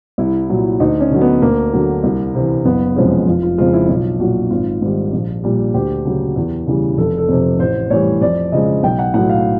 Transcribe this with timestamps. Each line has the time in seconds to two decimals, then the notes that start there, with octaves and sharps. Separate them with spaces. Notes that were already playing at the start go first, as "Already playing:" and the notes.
0.18 C2 E4
0.49 A#2 F#3
0.80 D2 D#4
1.00 C#4
1.11 D3 F#3
1.21 B3
1.42 D2 A#3
1.73 D3 F#3
2.04 C2
2.35 C3 E3
2.65 F#1 B3
2.96 F2 C3 F3 G#3 C#4
3.27 F1 F4
3.43 F4
3.58 F2 C#3 F3 G#3 F4
3.73 E4
3.89 B1 F4
4.20 A#2 F#3 F#4
4.51 G#1 F4
4.82 G#2 D#3 G3
5.13 A#1
5.44 A#2 G3
5.74 D2 G4
6.05 C#3 F#3
6.36 E2
6.67 C#3 E3 G3
6.98 F1 A4
7.18 A4
7.29 F2 C3
7.59 A1 C5
7.90 A2 E3 G3 C#5
8.21 F2 D5
8.52 C#3 F3 G#3 D#5
8.83 B1 G5
8.99 F#5
9.14 A2 F#3 F#5
9.30 F5